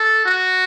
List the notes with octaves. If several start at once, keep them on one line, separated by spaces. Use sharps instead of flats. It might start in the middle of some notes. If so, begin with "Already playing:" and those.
Already playing: A4
F#4